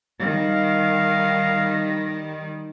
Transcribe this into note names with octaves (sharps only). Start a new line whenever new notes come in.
D#3 G3 F5